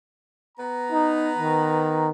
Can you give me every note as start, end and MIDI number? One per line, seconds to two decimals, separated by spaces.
0.58 2.08 59
0.58 2.08 71
0.58 2.08 82
0.92 1.31 63
1.38 2.10 51